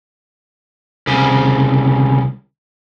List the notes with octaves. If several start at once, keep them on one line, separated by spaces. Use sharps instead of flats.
C2 C#3